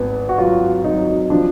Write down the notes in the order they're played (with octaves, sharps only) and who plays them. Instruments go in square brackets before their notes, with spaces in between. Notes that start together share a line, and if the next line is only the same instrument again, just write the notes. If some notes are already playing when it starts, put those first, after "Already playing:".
Already playing: [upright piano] G#1 B3
[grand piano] F#4
[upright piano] F#3 [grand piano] F4
[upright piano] F#3 [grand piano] D#4
[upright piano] F3 [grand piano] D4